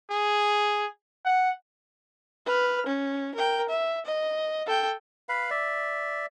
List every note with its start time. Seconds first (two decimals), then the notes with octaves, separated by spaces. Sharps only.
0.10 G#4
1.25 F#5
2.46 B4 F6
2.86 C#4
3.35 A#4 G5
3.69 E5
4.06 D#5
4.66 A4 G5
5.29 B4 F5 B5
5.50 D5 E5